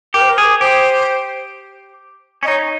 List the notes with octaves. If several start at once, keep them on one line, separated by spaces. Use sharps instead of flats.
G4 A#4
C5
A#4
G#4
G4 C5
C#4 D#5
D#4 C#5